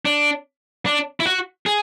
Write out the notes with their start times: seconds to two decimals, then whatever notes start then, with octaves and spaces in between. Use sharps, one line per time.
0.05 D4
0.86 D4
1.20 E4
1.25 F#4
1.66 G#4